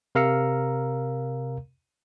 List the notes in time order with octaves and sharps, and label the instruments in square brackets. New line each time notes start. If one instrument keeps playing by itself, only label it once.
[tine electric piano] C3 A#4 F5 A#5 E6 C#7